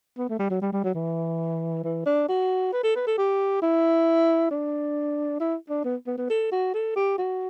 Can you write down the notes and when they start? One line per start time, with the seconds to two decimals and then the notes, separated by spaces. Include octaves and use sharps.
0.18 B3
0.29 A3
0.39 G3
0.50 F#3
0.61 G3
0.72 G3
0.83 F#3
0.95 E3
1.84 E3
2.06 D4
2.28 F#4
2.73 B4
2.83 A4
2.95 B4
3.07 A4
3.17 G4
3.62 E4
4.51 D4
5.40 E4
5.69 D4
5.84 B3
6.07 B3
6.18 B3
6.30 A4
6.52 F#4
6.74 A4
6.96 G4
7.18 F#4